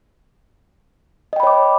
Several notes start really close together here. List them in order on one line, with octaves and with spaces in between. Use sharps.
D#5 G5 B5 C#5 D6